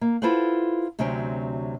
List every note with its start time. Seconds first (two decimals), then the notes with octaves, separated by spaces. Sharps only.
0.01 A#3
0.22 E4 F4 A4 B4 C5 F#5
0.99 D2 C3 F#3 C4 C#4 G5